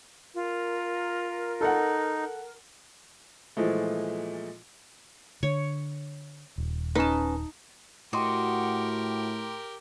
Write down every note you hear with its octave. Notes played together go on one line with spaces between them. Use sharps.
F4 A#4
D#4 A4 F#5
A#2 E3 F3 G#3 A3
D3 C#5
D#1
C#4 D#4 B4 A5
A2 F#4 G4 A#4 D#5 G5 C6 D6